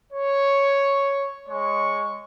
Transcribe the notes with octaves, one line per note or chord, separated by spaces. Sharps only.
C#5
G#3 C#5 C#6